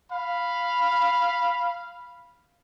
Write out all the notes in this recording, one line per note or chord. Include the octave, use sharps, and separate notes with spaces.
F5 B5